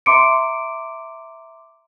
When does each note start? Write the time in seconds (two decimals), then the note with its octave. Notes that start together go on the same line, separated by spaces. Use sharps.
0.06 E5 A#5 C6 D6 C#7 D7